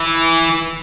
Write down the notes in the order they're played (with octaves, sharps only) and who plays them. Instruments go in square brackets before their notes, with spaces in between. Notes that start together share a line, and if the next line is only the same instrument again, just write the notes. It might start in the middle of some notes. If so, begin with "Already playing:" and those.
Already playing: [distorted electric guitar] E3